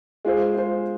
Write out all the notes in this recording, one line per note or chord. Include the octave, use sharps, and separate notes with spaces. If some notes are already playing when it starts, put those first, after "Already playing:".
G#3 F4 G#4 C5
G#3 F4 G#4 C5